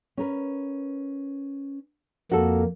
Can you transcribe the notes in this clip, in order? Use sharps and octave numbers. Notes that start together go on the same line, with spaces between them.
C#4 A#4 B4
F2 A#3 F#4 A4